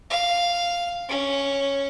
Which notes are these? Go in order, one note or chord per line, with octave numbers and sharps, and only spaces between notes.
F5
C#4